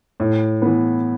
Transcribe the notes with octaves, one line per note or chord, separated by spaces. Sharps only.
A2
E3 B3